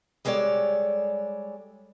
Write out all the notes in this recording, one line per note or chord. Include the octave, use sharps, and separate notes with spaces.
G3 G#3 A4 C#5 D5